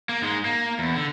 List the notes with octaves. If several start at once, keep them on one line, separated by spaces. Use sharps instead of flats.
A#3
G#2 G#3
A#3
E2
D3